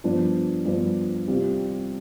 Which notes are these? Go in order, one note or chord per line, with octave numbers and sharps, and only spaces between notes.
G2 F3 B3 D4
G2 F3 B3 D4
C2 C3 G3 C4 F4